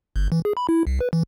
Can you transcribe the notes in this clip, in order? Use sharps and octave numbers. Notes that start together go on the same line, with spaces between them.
G1
E3
G#4
B5
E4
C2
B4
E3